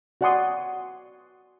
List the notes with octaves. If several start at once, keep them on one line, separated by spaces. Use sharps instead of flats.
F#4 D5 F#5 G#5 C6 D#6